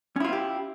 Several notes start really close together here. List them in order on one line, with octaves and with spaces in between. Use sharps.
C#4 E4 F4 B3 G4